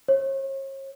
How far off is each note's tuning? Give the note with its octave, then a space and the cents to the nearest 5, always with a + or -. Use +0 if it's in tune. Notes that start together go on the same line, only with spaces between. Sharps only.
C#5 -40